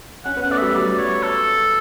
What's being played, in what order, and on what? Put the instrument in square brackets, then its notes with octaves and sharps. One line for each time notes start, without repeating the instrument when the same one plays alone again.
[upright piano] C#4 [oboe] F#5
[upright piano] B3
[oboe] F#5
[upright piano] A3 [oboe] D5
[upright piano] G3 [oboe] E5
[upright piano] F#3 [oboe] D5
[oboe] C#5
A4